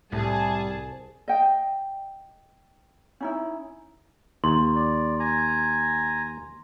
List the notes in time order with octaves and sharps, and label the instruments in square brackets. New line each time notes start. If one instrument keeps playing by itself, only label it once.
[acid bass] C2 [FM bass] A2 [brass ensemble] G3 [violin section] G#4 A5
[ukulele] D#5 G5
C#4 D#4 E4
[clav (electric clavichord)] D#2 [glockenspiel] C6
[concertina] D5
G#5 A#5